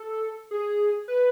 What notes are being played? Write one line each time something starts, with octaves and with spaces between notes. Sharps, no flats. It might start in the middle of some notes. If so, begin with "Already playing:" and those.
Already playing: A4
G#4
B4